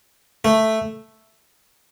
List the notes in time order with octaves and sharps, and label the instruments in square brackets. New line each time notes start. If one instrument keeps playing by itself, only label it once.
[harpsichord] A3